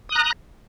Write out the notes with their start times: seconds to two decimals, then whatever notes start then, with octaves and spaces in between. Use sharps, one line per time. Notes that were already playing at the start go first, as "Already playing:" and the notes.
0.09 D#6
0.12 F#6
0.15 A#5